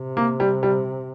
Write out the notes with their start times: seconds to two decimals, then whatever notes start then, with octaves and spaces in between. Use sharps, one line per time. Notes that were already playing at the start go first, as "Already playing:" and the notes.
Already playing: C3
0.17 A#3
0.40 G3
0.63 G3